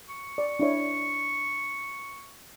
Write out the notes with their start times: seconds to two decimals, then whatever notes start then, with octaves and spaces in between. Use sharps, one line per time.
0.09 C#6
0.38 D5
0.59 D4 E4 C#5